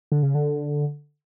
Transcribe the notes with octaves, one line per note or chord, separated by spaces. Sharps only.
D3
C#3
D3